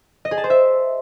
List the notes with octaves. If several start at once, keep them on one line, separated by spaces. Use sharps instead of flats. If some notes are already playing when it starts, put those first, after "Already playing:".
D#5
G#4
A5
C5
E5